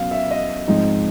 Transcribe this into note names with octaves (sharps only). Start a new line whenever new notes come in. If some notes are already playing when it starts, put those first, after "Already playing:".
Already playing: B2 F#3 C#4 F5
E5
D#5
G#2 F3 G#3 C4 D#4